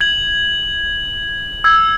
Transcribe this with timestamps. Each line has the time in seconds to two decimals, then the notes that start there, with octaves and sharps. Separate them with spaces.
0.01 G#6 F#7
1.64 E6 G#6